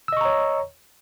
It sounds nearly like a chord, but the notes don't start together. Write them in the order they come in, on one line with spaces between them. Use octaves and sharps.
E6 D#5 C#6 A#5 C#5